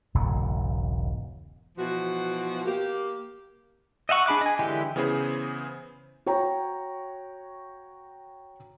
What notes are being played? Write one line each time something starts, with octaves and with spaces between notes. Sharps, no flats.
E1 B1 G#2 C#3
B2 E3 F3 F#4
A#3 G4
D#5 E5 F#5 C#6
D4 G#4 B5 D6 F#6
D#5 G#5
D3 E3 G#3 E4 G4
C#3 E3 B3 E4 G#4 C5
F#4 C#5 G5 A#5